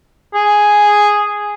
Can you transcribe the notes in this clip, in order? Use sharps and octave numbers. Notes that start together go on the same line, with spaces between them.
G#4